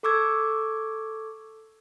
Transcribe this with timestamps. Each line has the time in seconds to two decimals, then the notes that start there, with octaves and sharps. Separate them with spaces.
0.03 A4 C#6 D6 E6 G#6